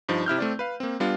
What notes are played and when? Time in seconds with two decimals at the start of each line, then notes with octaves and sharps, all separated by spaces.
0.09 G2 F3 D#4
0.26 C3 E4 F6 G6
0.38 A3 C4 D5
0.59 B4 F5
0.80 A#3 C4
1.00 G3 B3 D4 F4